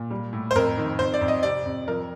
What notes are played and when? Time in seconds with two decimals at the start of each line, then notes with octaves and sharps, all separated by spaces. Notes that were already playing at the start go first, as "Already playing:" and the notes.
Already playing: A#2
0.10 G3
0.33 A2
0.51 C5
0.55 F2 A#4
0.77 D#3
0.98 F2 C5
1.14 D5
1.21 F2
1.28 D#5
1.43 C3 D5
1.65 F2
1.88 F3 A#4